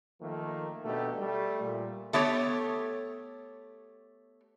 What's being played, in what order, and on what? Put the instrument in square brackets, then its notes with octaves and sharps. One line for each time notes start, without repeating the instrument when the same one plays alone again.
[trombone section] D#3 F3 A3 A#3
B2 A3 D4 D#4 G4
G3 A3
A#2
[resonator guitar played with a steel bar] A3 B3 G4 C#5